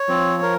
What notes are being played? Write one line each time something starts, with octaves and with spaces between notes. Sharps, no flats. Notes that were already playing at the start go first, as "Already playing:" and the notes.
Already playing: C#5
F3 C4
A#4